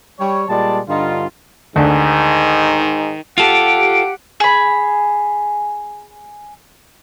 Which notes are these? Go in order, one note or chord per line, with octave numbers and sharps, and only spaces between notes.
G3 C#5
A#2 G3 G#3 D5 A5
G2 D3 D#4 F4
D2 G#2 D#3
F4 G4 A4 F#5 D7
G#4 B5